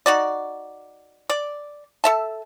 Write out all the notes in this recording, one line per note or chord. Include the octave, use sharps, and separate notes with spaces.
D#4 F#4 D5
D5
A4 E5 A5